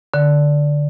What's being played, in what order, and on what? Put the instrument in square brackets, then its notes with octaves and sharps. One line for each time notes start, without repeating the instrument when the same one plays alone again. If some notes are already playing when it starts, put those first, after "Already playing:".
[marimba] D3